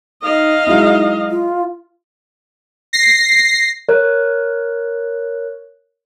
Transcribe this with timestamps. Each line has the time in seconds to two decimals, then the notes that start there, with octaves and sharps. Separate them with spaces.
0.22 D#4 D#5 F5
0.67 F#3 G#3 D#4 E4
1.29 F4
2.93 A#6 C7
3.89 A#4 C#5 F#6